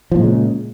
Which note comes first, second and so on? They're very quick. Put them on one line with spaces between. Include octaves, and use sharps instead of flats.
F3 A#2 G#3 C#3